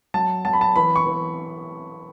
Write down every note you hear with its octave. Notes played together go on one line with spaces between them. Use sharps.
F#3 A5
F#3 A5
B5
A5
E3 B5
C#6
E3